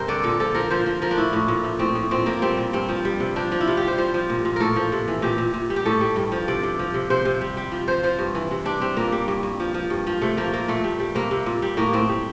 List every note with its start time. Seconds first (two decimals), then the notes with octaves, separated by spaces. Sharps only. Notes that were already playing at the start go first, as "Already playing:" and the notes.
Already playing: G2 C3 A#4 C5
0.08 D3 D5
0.24 A#2 A4
0.40 F3 A4
0.54 F3 A#4
0.70 F3 C5
0.86 F3
1.02 F3 A#4
1.11 D4
1.17 A2 E4
1.33 A2
1.48 A#2
1.64 F3
1.79 A2 C4
1.95 A2
2.11 A#2 C4
2.26 F3 A#3
2.42 G3 C4
2.57 A#2
2.73 G2 C4
2.89 F3
3.05 G3
3.20 C3
3.36 F3 D4
3.52 F3
3.61 E4
3.67 C3 F4
3.77 G3 G4
3.88 C5
3.98 F3 C5
4.14 F3
4.30 A#2
4.45 A#2
4.56 A2 A4 A#4
4.76 F3
4.92 C3
5.08 E3
5.22 A#2 G4
5.38 A#2
5.54 A#2
5.70 G3
5.76 G4
5.86 A2 A4
6.01 G3
6.16 G2
6.32 F3
6.48 C3 D5
6.63 C3
6.79 F3
6.94 C3
7.10 C3 C5
7.25 C3
7.41 G3
7.57 G3
7.72 F3
7.88 F3 C5
8.03 F3 C5
8.19 G2
8.35 E3
8.51 C3
8.65 G3 D4
8.81 G3 C4
8.96 A#2 A#3
9.12 G3
9.28 G2
9.43 G2
9.60 F3
9.74 F3
9.90 G2
10.07 F3
10.21 C3 A3
10.37 F3 A#3
10.53 A#2 A#3
10.68 A#2 A3
10.84 G3
11.00 G3
11.15 C3 A#3
11.31 C3
11.46 A#2
11.62 G3
11.77 A2 A#3
11.93 A2 C4
12.09 G3